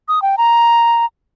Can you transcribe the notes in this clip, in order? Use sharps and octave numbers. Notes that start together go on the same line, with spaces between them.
D#6
G5
A#5